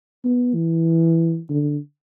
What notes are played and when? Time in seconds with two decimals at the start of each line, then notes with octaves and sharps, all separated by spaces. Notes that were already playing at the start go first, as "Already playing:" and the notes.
0.24 B3
0.55 E3
1.50 D3